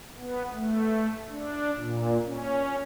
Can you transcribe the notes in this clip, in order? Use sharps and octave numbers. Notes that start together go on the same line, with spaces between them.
B3
A3
D4
A#2
C#4